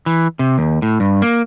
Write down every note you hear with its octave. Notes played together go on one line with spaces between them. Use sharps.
E3
C3
D#2
A2
G2
A#3